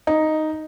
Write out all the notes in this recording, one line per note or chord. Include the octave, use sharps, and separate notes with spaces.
D#4